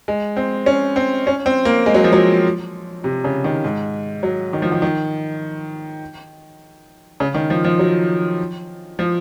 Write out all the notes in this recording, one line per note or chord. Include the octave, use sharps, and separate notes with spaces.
G#3
C4
C#4
C4
C#4
C4
A#3
G#3
F#3
F3
F#3
C3
C#3
D#3
G#2
F#3
D#3
F3
D#3
D#3
C#3
D#3
F3
F3
F#3
F3